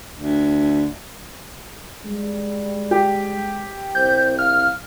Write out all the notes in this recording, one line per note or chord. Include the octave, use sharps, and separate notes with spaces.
D2
G3 G#3
G4
C2 C5 G6
F5 F6